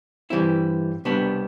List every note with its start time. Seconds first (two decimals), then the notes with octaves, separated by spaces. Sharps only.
0.30 G2 E3 G3 C4 E4
1.05 C2 B2 G3 B3 D4